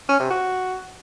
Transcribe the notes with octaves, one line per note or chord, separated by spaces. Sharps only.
C#4
C3
F#4